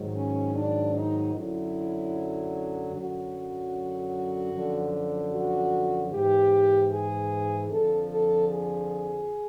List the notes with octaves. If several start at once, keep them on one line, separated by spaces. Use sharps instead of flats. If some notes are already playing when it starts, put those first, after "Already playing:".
Already playing: G#2 D#3 F#3
C#4
D4
D#4
F#2 D3 F#3 E4
F#2 D3 F#3 F#4
F#2 D3 F3
F#4
G#2 E3 G4
G#4
F2 D3 F3 A4
A4
G#4